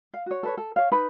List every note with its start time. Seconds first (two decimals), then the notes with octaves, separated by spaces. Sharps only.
0.14 F5
0.26 F#4 C#5
0.43 A4 B4 C#5
0.57 A4
0.76 C#5 F5
0.92 D#4 B4 B5